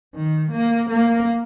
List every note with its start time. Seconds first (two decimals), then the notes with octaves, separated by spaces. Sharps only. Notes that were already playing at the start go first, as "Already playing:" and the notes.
0.15 D#3
0.52 A#3
0.89 A#3